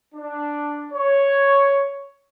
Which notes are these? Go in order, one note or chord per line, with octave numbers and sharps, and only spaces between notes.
D4
C#5